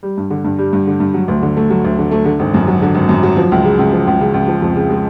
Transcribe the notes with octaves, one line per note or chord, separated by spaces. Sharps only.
G3
G2
D3
G2
G3
G2
D3
G2
F#3
D2
D3
A3
F#3
D2
D3
A3
D3
G#1
F#2
F#3
D3
G#1
F#2
F#3
F3
C#2
C#3
C#2
F3
C#2
C#3
C#2
F3
F2
C#3
G#3